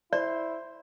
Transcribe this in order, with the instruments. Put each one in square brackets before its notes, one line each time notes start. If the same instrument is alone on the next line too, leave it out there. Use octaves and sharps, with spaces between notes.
[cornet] E4 [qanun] C5 [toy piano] D5